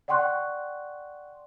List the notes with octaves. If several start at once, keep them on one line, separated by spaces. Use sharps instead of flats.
D5 F#5 G5 C6 C#6 F#6